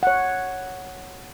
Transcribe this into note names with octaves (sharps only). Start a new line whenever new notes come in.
C#5 F#5